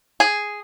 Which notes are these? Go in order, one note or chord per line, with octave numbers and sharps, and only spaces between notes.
G#4